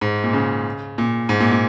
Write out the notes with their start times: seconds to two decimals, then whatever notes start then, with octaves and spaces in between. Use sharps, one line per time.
0.01 G#2
0.24 A#2
0.33 C#3
0.98 A#2
1.29 G#2
1.40 A#2
1.51 A#2